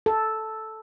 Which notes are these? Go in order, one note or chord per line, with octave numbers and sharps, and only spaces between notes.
A4